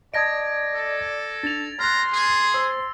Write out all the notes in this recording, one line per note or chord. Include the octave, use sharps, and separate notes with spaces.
D5 D#5 A5 D#6 G#6 A#6 D7
A4
D4 A6 F7
A#5 C6 F6 F#6
G#4
C5 E6